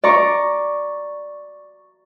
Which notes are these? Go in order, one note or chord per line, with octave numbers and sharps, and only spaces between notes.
D5 A#5 C#6